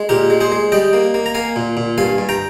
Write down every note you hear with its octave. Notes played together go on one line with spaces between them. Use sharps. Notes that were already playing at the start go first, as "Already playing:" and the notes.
Already playing: G#3
A#2 G4 A#4
G#3
G#4 C5
G#3
G3 D#5 G5
A#3
A#3
A#5
A#3 F5 G#5
A#2
A#2
G2 F5 G#5
G2
G5 A#5